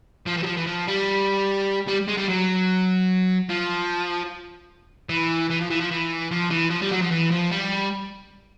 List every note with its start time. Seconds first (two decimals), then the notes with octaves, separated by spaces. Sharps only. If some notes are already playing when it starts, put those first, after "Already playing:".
0.26 F3
0.37 E3
0.43 F#3
0.46 F3
0.57 E3
0.66 F3
0.87 G3
1.88 G3
2.08 G#3
2.17 G3
2.28 F#3
3.49 F3
5.09 E3
5.50 E3
5.60 F3
5.70 E3
5.81 F3
5.91 E3
6.31 F3
6.51 E3
6.70 F3
6.82 G3
6.91 F#3
7.02 F3
7.11 E3
7.31 F3
7.51 G3